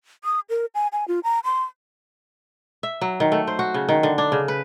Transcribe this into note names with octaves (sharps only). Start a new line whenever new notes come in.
D#6
A#4
G#5
G#5
F4
A#5
C6
E5
F#3
D#3
A3
C5
F#4
C#3
D#3
D3
D4
C#3
B4